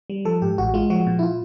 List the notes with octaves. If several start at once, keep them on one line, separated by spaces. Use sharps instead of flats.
G3
F3 A4
G#2 G4
A1 F#4
G#3 F4
F3 F#4
A#2
E4
F4